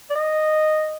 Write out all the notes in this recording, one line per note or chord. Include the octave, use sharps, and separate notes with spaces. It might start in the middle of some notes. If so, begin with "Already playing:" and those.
D5
D#5